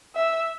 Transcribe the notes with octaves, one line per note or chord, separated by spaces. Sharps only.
E5